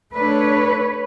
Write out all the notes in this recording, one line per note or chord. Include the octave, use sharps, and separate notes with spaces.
A3 D4 B4 C#5